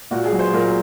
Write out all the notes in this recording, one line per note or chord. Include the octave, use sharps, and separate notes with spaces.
A#2 F#4
G#4
F#3
C5
A#2 A#4